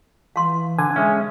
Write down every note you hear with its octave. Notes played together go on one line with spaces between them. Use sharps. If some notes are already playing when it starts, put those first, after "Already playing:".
E3 F5 C6
D3 G#5
G#3 C#4 E5